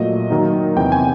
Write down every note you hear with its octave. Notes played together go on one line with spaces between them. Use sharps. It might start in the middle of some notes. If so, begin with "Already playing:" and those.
Already playing: A#2 F#3 A3 D#5
D#3 F#3 A#3 D#4
E2 C3 E3 G5
G#5